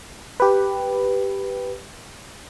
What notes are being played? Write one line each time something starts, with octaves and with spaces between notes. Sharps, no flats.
G4 B4